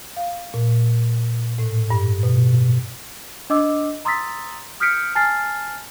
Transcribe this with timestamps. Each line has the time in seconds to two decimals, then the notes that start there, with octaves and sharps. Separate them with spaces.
0.17 F5
0.54 A#2
1.58 A2
1.90 G2
2.23 B2
3.50 D4 D#5 D6 E6
4.05 A#5 C6 D#6 E6 A6 B6
4.80 D#6 F6 G6 B6 C#7 D7
5.15 G#5 A5 F6 A6 C7